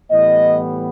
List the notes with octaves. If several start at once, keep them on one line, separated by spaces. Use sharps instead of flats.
A2 E3 G3 B3 D#5